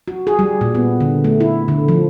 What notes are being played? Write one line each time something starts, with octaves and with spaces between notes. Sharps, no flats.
F#4
G#4
G3
A#2
B3
D3
A3
E4
D3
F3